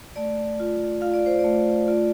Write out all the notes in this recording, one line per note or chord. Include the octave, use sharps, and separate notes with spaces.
A3 D5
F4
F4 F5
D5
C5
D5
A3
F4 D5